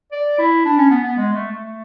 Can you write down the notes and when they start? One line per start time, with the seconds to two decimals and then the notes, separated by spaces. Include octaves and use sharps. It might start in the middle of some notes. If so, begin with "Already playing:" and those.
0.12 D5
0.39 E4
0.65 D4
0.78 C#4
0.91 B3
1.03 B3
1.17 G#3
1.33 A3
1.52 A3